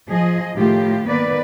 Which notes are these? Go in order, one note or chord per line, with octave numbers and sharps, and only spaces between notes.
F3 G#4 D#5
A2 D#3 F4 G4
D#3 A#3 B3 B4 D5